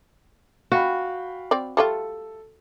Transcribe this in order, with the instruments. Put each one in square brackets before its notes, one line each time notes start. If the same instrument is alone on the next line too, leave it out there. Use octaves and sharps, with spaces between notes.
[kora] F#4 [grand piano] F5 G5 B5
[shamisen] C4 D5
[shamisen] G3 A3 F4 [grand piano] A4